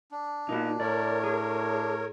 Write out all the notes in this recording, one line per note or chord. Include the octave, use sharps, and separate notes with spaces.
D4
A#2 D#4 F#4
A2 A#4 C#5 D5
G#4